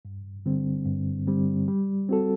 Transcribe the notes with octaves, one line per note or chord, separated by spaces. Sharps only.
G2
D3 G3 C4
G2
D3 G3 C4
G3
C4 F#4 A4